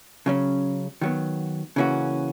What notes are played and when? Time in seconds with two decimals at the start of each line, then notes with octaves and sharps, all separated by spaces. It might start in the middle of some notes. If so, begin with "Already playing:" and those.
0.26 C#3 F#3 C#4
1.01 D#3 F#3 B3
1.76 C#3 E3 A#3 C#4 F#4